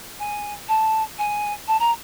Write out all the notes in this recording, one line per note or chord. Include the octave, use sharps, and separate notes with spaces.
G#5
A5
G#5
A5
A#5